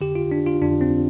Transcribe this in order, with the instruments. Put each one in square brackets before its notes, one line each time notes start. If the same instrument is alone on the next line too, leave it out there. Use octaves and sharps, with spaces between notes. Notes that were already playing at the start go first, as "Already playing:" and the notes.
[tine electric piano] F2 D3 G4
F4
D4
F4
F2 D3 D4
C4